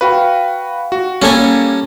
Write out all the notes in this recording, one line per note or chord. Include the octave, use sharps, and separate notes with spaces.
F#4 B4 F5 G5
F#4
G3 A#3 C#4 A4 G#5